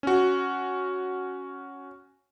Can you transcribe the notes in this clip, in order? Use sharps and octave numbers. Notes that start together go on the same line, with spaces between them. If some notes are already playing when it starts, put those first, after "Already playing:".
C#4 F#4